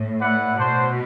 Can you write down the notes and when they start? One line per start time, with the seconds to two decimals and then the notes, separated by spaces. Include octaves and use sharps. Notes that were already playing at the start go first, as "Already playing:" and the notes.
Already playing: A2
0.20 E4 B4 D5 F#5
0.55 B2 D4 F#4 C5